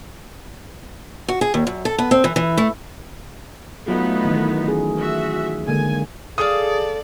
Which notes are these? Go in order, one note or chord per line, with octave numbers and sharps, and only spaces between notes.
F#4
G#4
D#2
F#2
A4
B3
C4
E3
E3
A3
F#3 A3 B3 D#4 F4
D#3 E3
A3 C#4 G#4
F#4 E5
D3 G#3 A#3 G#5
G#4 A4 D5 F5 D#6